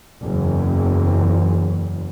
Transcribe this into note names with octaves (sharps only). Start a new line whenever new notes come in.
F#1 E2